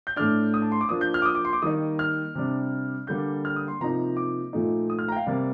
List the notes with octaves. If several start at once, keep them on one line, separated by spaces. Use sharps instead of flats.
G6
A2 A3 D4 F6
D#6
A5
C6
D6
F3 A#3 D4 D#6
G6
F6
D6
D#6
D6
C6
D6
D#3 G3 A#3 D#4 D#6
F6
C3 G3 D4
D3 G3 A#3 D4 G6
F6
D#6
C6
C3 F3 A#3 D#4 A#5
D6
A#2 F3 A3 D#4
D#6
F6
A#5
G5
F5
C3 G3 A#3 D5